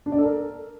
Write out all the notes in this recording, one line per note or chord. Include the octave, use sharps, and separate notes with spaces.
D4
D5
A4
A#4